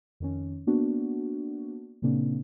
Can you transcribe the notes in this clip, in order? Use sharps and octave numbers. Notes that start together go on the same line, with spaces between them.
F2 D#3 C#4
A#3 B3 D4 F#4
A#2 C#3 A#3 C4 D4